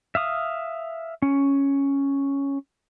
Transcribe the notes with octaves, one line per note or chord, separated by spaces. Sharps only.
E5 F5 D#6
C#4